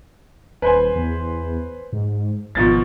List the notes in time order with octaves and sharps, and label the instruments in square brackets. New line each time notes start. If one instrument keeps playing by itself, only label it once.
[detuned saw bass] D#1 [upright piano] B4 C5 G#5
[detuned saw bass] E2
G#2
[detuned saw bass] G#1 [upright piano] B2 F3 A6